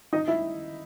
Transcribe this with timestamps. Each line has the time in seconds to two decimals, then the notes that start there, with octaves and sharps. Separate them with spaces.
0.13 D#4 D#5
0.28 E4 E5